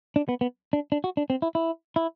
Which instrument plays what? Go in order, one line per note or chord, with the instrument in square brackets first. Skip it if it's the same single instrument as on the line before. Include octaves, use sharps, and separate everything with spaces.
[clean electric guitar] D4
B3
B3
D4
D4
F#4
D4
C4
E4
E4
E4